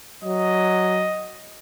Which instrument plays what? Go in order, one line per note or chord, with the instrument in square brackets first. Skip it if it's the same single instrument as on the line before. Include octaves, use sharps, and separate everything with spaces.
[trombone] F#3 [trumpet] D#5